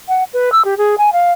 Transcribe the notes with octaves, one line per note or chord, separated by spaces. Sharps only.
F#5
B4
E6
G4
G#4
G#5
F5